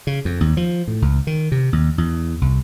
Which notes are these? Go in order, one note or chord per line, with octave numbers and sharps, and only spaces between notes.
C#3
F2
D#2
F3
A2
C#2
D#3
C3
D#2
E2
C2